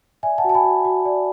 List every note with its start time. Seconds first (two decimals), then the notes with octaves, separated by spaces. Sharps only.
0.23 D5 E5 G#5
0.38 F#5 A5
0.44 F#4
0.49 A5
0.55 G#5 B5
0.64 F#4
0.85 F#4
1.05 D5